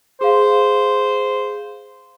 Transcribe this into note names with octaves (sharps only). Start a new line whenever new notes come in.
G#4 C5 F5